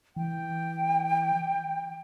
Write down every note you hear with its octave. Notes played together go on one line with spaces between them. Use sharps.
E3 G5